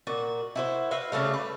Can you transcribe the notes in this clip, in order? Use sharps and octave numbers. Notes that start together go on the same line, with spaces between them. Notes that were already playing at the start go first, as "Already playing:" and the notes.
A#2 F#4
E4 F#4 C5
F#4 B4 E5 F5
C#3 G3 A3 F5
B4